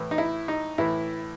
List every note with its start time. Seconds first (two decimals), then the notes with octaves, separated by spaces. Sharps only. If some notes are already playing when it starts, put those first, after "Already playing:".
Already playing: A2 E3
0.11 D#4
0.18 E4
0.48 D#4
0.78 A2 E3 E4